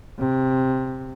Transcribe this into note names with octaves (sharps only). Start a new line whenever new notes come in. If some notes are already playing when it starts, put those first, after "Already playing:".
C3